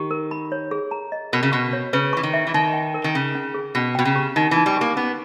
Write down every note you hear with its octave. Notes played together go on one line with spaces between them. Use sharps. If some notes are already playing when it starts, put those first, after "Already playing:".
Already playing: D#3 G4
A#4
B5
C#5
G#4
A#5
D#5
B2 A#4
C#3
B2 C#6
C#5
C#3 B4
E3 C#6
D#3
E5
E3
D#3 D#4
G5
A#4
D#3
C#3 C#4
C#4
G#4
B2 C#4
B2 G5
C#3
G4
D#3 D#4
E3
D#4
G3
A#3 G4
B3 C#4